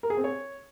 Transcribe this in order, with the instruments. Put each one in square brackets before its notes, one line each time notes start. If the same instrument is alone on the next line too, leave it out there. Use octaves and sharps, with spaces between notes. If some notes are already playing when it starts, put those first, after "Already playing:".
[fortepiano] A#4
G#4
C4
C#5